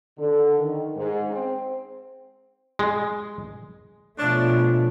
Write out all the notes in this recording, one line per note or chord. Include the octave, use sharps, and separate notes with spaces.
D3
D#3
G#2
C4
G#3
B2 F3 A3 D4 C#5